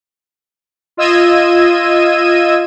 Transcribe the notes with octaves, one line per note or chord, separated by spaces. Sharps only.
F4 D#5 E6 G#6 D#7